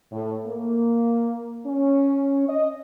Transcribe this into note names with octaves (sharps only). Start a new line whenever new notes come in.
A2
A#3
C#4
D#5